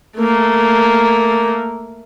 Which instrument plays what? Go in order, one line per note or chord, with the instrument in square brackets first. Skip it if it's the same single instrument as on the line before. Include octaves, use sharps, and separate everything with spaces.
[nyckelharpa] A3 A#3